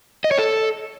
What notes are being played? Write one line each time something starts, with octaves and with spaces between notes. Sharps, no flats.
D#5
C#5
A4